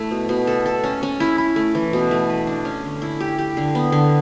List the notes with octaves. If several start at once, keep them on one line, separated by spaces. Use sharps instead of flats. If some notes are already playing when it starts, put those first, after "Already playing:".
Already playing: A3 E4
B2
B2
A4
A4
C#4
C#4
E4
E4
A3
E3
B2
A3
B4
D4
C#4
D3
E4
G4
G4
D3
B3
D3